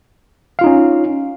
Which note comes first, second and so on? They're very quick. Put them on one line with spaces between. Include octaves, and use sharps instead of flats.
F5 F4 D#4 C#4